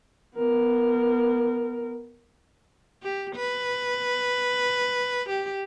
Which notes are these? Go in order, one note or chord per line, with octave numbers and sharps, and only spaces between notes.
B3 A#4
G4
B4
G4